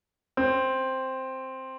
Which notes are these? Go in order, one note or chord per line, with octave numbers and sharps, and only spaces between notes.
C4